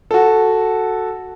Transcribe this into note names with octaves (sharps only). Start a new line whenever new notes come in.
F#4 A4